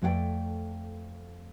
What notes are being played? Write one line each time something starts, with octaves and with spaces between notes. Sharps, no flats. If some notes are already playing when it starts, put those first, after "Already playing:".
F2 A3 D4 G4 D5 G5